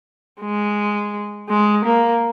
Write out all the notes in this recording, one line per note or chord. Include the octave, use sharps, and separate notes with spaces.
G#3
G#3
A#3